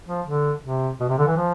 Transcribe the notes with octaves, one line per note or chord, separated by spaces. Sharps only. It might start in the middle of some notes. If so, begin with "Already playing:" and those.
F3
D3
C3
B2
C3
D3
E3
F3